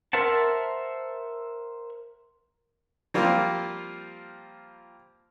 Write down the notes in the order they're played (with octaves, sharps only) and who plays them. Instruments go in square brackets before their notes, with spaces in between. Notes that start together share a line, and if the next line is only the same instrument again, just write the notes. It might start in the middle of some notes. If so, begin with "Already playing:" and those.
[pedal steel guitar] A#4 C5 E5 F#5 A5
[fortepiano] F3 G3 A#3 C4 F4